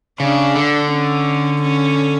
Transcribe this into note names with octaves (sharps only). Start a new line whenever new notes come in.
C#3 D4
D3
C#4
C#4